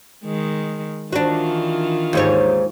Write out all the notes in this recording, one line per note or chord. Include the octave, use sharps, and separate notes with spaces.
D#3 G#3
D#3 E3 D4 F4 F#4
D#2 G#2 C#5